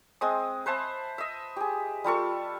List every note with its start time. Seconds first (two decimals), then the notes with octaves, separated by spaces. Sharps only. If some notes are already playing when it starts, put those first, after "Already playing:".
0.21 G#3 C4 D#6
0.66 B4 C5 E5 A5
1.18 D#5 E5
1.56 G4 G#4
2.04 G3 F4 A4 C#6